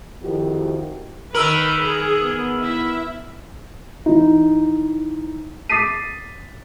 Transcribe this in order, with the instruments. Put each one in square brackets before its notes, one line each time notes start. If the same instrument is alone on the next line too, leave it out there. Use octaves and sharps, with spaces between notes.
[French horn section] F2 D#3 F3 E4 F#4 G4
[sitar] D#3 A#4 [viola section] B4 [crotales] E6 F6 F#7
[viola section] G#4
[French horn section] B3
[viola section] E4 E5
[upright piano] E3 D#4
D6 D#6 A6 B6 C7 D#7